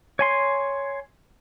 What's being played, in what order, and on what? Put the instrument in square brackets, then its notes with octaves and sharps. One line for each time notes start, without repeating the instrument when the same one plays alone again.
[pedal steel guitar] C#5 G#5 C6